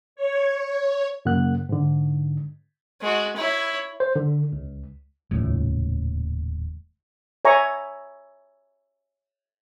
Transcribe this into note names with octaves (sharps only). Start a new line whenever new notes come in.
C#5
F#2 C#3 A#3 F#5 F#6
G#2 D3
G#3 F#4
E4 C#5
C5
D3
C#2
D#1 C#2 A2
C#5 E5 G#5 A#5 C#6